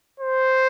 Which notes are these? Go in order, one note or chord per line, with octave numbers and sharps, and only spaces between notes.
C5